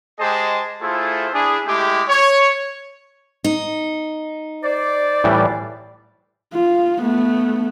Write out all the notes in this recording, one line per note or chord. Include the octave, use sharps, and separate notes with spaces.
G#3 G4 G#4 C5 D#5 A5
A3 E4 F4 G#4 A4 C5
D4 E4 G#4
G#3 A3 E4 G4
C#5
D#4
C5 D5
A2 E3 G3
F4
A3 B3